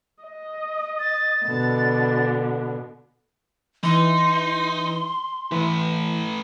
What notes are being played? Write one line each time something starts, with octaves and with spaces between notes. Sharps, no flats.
D#5
A6
B2 D3
E3 D#4 C6
E3 A3 B4